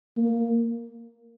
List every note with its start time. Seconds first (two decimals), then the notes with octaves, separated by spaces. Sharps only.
0.17 A#3